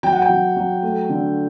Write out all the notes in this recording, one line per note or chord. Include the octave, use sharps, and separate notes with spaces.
F#3 G5
F#5
G5
F#3
F#3
A3
D3